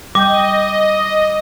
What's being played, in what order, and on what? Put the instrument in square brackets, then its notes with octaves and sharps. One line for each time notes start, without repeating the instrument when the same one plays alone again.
[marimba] G3 G5 G6 [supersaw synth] D#5 [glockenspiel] D6